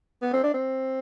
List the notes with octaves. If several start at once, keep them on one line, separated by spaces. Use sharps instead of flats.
B3
C4
D4
C4